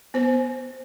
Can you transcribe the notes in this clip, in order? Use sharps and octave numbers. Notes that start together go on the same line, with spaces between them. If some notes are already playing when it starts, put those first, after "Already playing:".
B3 C5